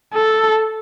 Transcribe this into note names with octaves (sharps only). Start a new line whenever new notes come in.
A4